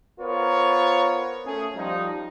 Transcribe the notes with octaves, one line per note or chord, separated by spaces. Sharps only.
B3 F4 A#4 C5 C#5
A3 C#4 G#4
F3 G3 D#4